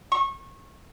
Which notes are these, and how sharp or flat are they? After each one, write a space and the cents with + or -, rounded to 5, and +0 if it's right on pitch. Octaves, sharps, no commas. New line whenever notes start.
C#6 -30